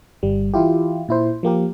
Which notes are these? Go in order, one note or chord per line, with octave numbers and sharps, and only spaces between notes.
G1 G3
E3 E4 F4 G4
A#2 E4 C5
F3 A#3 G4 A#4